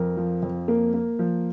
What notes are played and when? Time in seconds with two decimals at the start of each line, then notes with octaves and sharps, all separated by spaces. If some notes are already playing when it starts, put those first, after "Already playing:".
Already playing: F2 A#4
0.17 F3
0.43 F2
0.68 A#3 A#4
0.94 A#3
1.19 F3